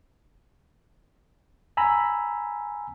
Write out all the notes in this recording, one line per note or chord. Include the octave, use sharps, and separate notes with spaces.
G#5 A#5 B5 E6